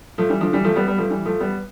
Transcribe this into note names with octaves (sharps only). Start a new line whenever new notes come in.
F3 A3
E3 G3
D3 F3
E3 G3
F3 A3
G3 B3
G3 B3
F3 A3
E3 G3
F3 A3
G3 B3